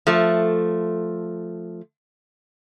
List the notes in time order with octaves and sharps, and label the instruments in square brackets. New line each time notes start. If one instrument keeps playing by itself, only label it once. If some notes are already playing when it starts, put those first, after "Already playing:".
[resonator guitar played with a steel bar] F3 A3